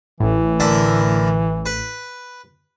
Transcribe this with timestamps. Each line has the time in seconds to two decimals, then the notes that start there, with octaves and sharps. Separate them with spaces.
0.20 A1 A2 E3
0.60 D3 E4 A#4
1.66 B4